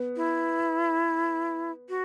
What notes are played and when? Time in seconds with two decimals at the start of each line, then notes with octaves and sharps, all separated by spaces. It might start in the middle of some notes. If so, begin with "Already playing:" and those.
Already playing: B3
0.16 E4
1.89 F#4